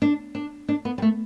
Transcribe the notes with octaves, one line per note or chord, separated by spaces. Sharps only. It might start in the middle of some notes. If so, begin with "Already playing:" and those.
D4
D4
D4
B3
G3
A3